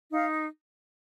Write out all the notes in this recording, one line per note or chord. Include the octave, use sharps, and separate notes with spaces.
D#4 F5